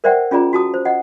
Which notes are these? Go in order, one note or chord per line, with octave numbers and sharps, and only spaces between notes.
A#4 C5 D5 E5 F#5 G5
C#4 F4 G#4 D5 A#5
F#4 A5 D#6
C5
D#5 F#5